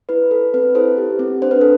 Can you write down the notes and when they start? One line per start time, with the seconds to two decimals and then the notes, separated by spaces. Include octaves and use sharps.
0.09 E4 B4
0.31 A4
0.54 C4 B4
0.75 E4 A4 C5
0.97 G4
1.19 C4
1.42 D4 C5
1.51 B4
1.61 A4